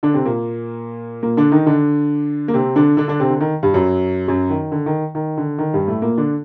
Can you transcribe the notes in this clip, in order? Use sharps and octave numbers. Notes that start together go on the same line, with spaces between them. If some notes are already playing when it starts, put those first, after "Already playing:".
D3 D4
C3 C4
A#2 A#3
A#2 A#3
D3 D4
D#3 D#4
D3 D4
A#3
C3 C4
D3 D4
D3 D4
D3 D4
C3 C4
D3
D#3
G2 G3
F#2 F#3
F#2 F#3
D#3
D3
D#3
D#3
D3
D#3
G2 G3
A2 A3
A#2 A#3
D3 D4